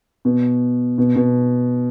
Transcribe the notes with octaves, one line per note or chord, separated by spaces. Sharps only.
B2
B2
B2